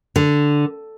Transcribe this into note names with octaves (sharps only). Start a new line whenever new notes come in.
D3